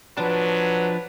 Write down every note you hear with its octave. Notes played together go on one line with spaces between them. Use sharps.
F3 F#3 D4 B4